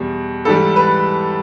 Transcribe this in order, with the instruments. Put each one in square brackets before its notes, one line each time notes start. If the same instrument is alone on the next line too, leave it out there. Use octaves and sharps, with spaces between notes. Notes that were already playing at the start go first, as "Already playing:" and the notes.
Already playing: [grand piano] E2 B2 G3
G#2 E3 G3 A4
B4